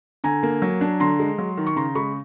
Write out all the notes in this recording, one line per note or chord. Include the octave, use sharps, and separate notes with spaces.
D3 G#5 A#5
A#3
F#3
D4
D3 A#5 C6
G#3
F#3
D#3
C#6
C#3 A#5 C6
G#3 B5 C#6